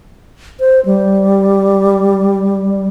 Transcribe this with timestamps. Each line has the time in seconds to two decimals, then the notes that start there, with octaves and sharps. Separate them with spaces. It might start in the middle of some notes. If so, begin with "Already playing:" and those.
0.60 C5
0.85 G3